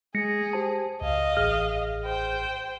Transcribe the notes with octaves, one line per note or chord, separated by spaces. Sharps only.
G#3 G#4 A#6 C#7
G4 C5 A5
C#2 D#5 F5
A1 G#4 F6
C5 G5